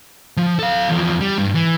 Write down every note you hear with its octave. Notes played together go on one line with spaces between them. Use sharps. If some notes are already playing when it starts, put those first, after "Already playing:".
F3
A4 F5
E2 F3
G3
G2
E3